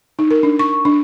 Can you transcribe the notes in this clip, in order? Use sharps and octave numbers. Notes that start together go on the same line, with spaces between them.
D#4
A#4
D4
C#6
D4